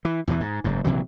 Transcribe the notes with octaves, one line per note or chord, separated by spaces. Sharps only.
E3
E2 G2 B2 E3
G#2
F#1 G#2
A#1 C3 E3 F#3